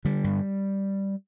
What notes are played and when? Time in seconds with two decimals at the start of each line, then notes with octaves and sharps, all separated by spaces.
0.05 D3 G3
0.24 G2